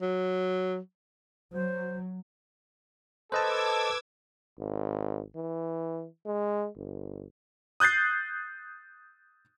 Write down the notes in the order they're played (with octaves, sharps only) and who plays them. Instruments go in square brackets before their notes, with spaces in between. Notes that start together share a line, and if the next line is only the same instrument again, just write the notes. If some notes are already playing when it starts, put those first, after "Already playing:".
[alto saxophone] F#3
[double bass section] F#3 [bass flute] C5
[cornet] A4 [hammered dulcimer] B4 [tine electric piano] C5 D#5 A5 [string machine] D6 E6 G#6
[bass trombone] G#1
E3
G#3
G1
[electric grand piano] D#6 F#6 G6 A6 C7